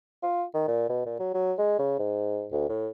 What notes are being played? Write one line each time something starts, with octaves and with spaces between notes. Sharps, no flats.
F4
D#3
A#2
B2
A#2
F#3
F#3
G#3
C#3
G#2
D2
A2